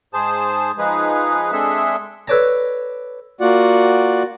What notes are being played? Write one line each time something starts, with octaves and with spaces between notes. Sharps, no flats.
G#2 G#4 C5 A5
F3 G#3 D#4 G#4 B4
G#3 C4 D4 G#4 A4 E5
A4 B4 C#5 D5 A5 A#5
A#3 F4 F#4 D5 F#5